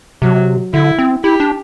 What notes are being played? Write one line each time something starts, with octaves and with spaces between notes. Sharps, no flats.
C3 F#3
D3 E4
C4
E4 G4
D4